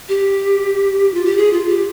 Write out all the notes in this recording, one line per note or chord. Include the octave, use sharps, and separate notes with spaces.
G4
F4
G4
G#4
F4
G4